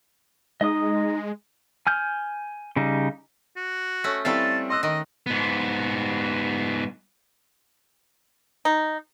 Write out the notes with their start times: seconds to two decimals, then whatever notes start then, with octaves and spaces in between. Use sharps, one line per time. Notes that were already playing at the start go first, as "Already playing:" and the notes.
0.61 G#3 D#4 D#5 D#6
1.87 G#5 F6 G6
2.76 C#3 G3 D#4
3.57 F#4
4.04 A3 C#4
4.25 G3 C4 E4 A4 B4 F5 A5
4.70 D#5 C6 E6 F#6
4.83 D#3 D#5
5.27 G#2 B3
8.65 D#4